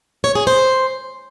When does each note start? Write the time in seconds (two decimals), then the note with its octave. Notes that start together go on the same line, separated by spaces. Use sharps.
0.24 C#5
0.35 G#4
0.47 C5